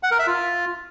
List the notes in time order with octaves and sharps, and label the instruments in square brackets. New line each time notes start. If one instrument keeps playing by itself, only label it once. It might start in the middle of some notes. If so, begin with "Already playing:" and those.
[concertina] F#5
A#4
E5
F4